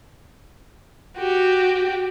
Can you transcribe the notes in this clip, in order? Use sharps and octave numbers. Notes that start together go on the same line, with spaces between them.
F#4 G4